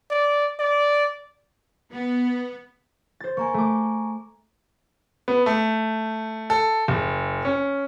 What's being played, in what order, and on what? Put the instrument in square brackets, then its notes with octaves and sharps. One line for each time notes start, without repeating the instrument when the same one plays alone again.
[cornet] D5
D5
[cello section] B3
[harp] C5 A6
[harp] A#3 [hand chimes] G#5 A#5 C#6
[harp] A3 D6
[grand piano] B3
A3
A4
F#1
C#4